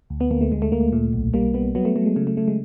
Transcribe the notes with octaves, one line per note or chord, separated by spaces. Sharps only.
D2
B3
D2 A#3
A3
D2 G#3
A3
D2 A#3
A#2 A3
B1
G3 A#3
G3 B3
F#3 B3
A3
F#3 A3
G#3
C#3 A3
A3
C#3 A3
G#3